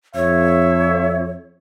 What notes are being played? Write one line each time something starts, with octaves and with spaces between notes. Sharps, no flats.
F2 C#5 E5